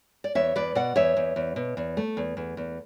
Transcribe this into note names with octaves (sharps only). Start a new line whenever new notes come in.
D5
E2 C#5 E5
E2 B4 D5
B2 D5 F#5
E2 C#5 E5
E2
E2
B2
E2
A3
E2
E2
E2